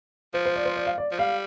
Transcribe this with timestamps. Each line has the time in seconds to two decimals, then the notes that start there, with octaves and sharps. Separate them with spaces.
0.34 F3 C5
0.46 C5
0.56 D5
0.65 C5
0.76 D5
0.87 F5
0.98 D5
1.12 F3
1.19 G3 F5